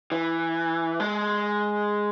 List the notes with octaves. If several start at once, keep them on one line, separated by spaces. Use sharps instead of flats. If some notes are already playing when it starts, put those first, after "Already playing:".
E3
G#3